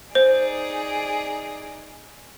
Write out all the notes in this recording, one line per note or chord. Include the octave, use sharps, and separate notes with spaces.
D#4 G#4 C5 D5